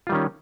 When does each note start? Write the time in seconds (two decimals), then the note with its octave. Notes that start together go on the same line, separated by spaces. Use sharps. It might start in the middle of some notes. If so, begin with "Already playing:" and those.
0.07 F4
0.09 G3
0.12 D#3
0.15 C#4